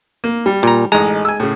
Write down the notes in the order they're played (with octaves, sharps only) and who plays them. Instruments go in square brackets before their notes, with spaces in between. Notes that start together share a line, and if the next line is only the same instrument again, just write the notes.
[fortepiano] A#3
G3
[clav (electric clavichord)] A#2 A#5
[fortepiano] A1 D#4 [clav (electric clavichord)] G#3 A#5
[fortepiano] G#5 E6
A2 C#3